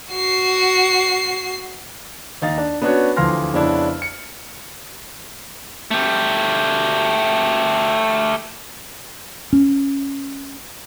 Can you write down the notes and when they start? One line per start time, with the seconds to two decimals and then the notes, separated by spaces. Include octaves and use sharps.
0.13 F#4 C7
2.42 D#2 D#4 F5 A6
2.58 D4
2.82 B3 C#4 D4 F#4 B4 C#5
3.16 D2 E3 F3 C6 F6 A#6
3.53 F2 C#3 B3 C#4 D4 E4
4.02 C#7
5.91 A3 G4
9.53 C#4